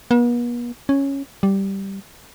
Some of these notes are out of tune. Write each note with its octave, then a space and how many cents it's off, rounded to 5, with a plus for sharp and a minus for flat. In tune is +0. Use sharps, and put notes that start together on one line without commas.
B3 -45
C#4 -5
G3 -5